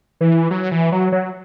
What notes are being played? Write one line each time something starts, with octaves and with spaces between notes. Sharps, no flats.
E3
F#3
E3
F#3
F#3